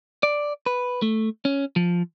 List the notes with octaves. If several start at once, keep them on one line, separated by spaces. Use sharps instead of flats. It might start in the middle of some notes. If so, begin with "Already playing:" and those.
D5
B4
A3
C#4
F3